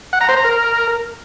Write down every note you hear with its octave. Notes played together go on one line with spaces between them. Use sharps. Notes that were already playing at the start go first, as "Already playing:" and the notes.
F#5
A#5
C5
A#5
A#4